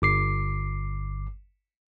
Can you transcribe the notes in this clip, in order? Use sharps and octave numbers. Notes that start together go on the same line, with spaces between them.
G1 D6 C7